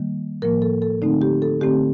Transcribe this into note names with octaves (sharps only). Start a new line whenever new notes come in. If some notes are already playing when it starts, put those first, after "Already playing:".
Already playing: D#3 G3 A#3
A2 F3 A#3 A#4
A4
A4
D3 A3 C4 D#4
G4
A4
D3 A3 C4 G4